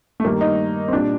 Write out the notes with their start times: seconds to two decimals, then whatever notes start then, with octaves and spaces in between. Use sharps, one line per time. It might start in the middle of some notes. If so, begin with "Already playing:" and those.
0.20 A3
0.24 G2 D#3 G3 A#3
0.41 D#4
0.88 C4
0.92 A#2 G3 D4